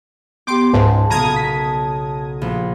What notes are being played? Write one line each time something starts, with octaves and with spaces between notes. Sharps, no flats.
B3 G4 G5 C6 D6
C#2 G#2 A5
B1 A#2 C#3 A#5 D#6 G#6
B6
A#1